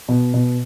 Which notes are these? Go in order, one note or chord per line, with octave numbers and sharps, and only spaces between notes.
B2
B2